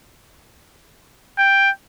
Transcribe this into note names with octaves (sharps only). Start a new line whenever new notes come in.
G5